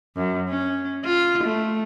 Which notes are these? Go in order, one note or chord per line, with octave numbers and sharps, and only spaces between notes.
F#2
C#4
F4
A3